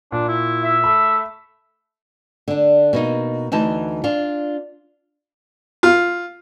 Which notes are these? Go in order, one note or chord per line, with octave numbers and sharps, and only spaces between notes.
A#2 D4
E4
E5
A3 B5
D3 D4
B2 A#3 D#4
D2 E3 D#4 A5
D4 F4
F4